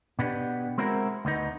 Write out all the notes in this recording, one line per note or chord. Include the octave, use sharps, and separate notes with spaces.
B2 B3 D4 D#4 G4
G#3 C4 E4 F#4 A#4
D2 B3 D#4